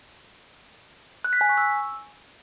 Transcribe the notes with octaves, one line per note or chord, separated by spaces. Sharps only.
F#6
B6
G#5
C#6
E6